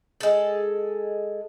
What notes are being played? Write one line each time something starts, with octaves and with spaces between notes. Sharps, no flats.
G#3 A4